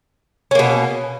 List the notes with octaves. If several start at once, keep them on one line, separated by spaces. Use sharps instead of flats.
B2 A#3 C#4